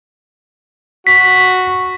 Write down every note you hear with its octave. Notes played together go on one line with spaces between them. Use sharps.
F#4 B6